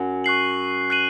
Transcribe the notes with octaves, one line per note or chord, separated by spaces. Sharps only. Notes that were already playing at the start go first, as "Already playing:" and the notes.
Already playing: F#2
C#6 F#6 C7 F#7
F#6 C7 D#7 F#7